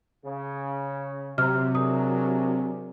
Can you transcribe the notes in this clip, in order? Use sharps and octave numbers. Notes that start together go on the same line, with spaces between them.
C#3
C3 F#3 A#5 F6
D4 G#4 A#4 D#6